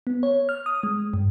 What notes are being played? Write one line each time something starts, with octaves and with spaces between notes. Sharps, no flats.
B3
C#5
F6
D#6
G#3
G2